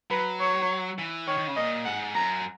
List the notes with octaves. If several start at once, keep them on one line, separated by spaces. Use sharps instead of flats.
F#3 B4
C#5
E3
D#3 C#5
D#3
C#3
A#2 D#5
G#2 F#5
F#2 A#5